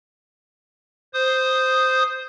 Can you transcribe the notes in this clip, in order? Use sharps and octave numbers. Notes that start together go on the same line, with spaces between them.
C5 D#6